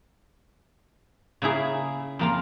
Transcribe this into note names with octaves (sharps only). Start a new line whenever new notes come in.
C#3 A#3 E4 G#4
F2 A#3 F4